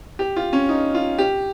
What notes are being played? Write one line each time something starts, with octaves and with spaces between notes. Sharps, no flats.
G4
F4
C#4
D#4
F4
G4